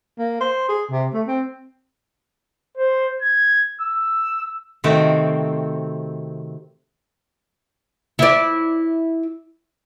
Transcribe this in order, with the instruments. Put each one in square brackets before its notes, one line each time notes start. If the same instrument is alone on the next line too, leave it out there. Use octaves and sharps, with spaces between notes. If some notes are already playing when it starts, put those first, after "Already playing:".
[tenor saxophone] A#3
C5
G#4
C3
A3
C4
[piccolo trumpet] C5
G#6
E6
[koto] C3 D#3 A3 C4 F#4
[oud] E4 D5